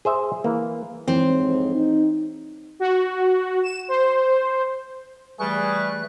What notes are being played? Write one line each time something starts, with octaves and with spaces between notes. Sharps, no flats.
G#4 C5 E5
E3 A#3
F2 G#2 E3 C4 C#5
D#4
F#4
E7
C5
E3 G3 A3 G#4 B4 C#6 F#6